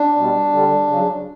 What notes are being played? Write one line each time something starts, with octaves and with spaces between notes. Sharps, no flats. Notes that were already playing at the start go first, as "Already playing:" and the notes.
Already playing: D4
B2 G3
D3 G3
C#3 F#3